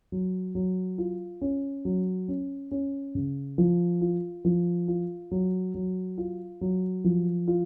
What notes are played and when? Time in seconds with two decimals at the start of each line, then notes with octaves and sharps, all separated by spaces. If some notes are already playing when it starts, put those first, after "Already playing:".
0.12 F#3
0.55 F#3
0.98 F4
1.41 C#4
1.85 F#3
2.28 C#4
2.71 C#4
3.15 C#3
3.58 F3
4.01 F4
4.45 F3
4.88 F4
5.31 F#3
5.74 F#3
6.18 F4
6.61 F#3
7.04 F3
7.48 F4